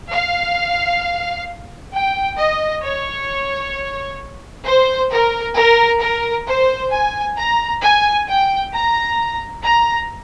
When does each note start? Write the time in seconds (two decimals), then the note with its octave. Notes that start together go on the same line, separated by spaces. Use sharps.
0.12 F5
1.93 G5
2.39 D#5
2.84 C#5
4.65 C5
5.11 A#4
5.56 A#4
6.01 A#4
6.46 C5
6.92 G#5
7.37 A#5
7.82 G#5
8.28 G5
8.73 A#5
9.63 A#5